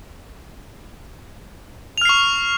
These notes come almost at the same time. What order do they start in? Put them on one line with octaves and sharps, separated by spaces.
F7 F6 C7 C#6